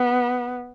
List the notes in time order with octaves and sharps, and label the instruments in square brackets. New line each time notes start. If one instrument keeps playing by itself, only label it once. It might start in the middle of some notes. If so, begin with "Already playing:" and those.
Already playing: [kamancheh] B3